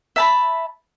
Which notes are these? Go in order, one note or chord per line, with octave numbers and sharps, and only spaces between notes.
E5 A5 B5